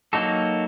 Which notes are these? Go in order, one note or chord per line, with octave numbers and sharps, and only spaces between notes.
F#3 A#3 D#4 F#4 A4